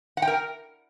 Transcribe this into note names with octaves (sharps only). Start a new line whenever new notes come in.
F#5
G5
A#4